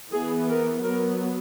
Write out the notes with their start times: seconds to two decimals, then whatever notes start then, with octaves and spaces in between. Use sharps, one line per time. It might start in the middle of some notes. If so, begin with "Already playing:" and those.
0.11 E3 B3 G#4
0.48 A#4
0.83 F#3 B3 A#4